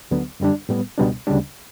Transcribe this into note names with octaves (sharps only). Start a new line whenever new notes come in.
D2 D3 F#3 B3
F#2 D3 G3 D4
A2 G3 B3
C#2 B2 G3 B3 D4
D2 C#3 G3 D4